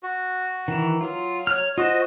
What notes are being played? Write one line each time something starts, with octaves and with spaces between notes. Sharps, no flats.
F#4
D#3 E3
F#3 F4
C#5 F6
F4 F#4 C5 D#5